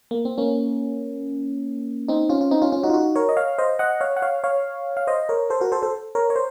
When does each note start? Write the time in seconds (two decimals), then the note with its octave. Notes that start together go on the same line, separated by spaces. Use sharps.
0.11 A#3
0.25 C4
0.38 A#3 C#4
2.08 C4 D#4
2.30 C#4 F4
2.41 F4
2.51 C4 D#4
2.62 C#4 F4
2.72 C#4 F4
2.83 D#4 F#4
2.90 F4
2.93 D#4 F#4
3.16 A#4 C#5
3.29 D#5
3.37 C#5 F5
3.58 C5 D#5
3.79 D#5 F#5
4.00 C#5 F5
4.17 F#5
4.22 C#5 F5
4.44 C#5 F5
4.97 F5
5.07 C5 D#5
5.29 A#4 C#5
5.50 A4 C5
5.61 F#4 A#4
5.72 A4 C5
5.82 A4 C5
6.15 A#4 C#5
6.30 C#5
6.36 C5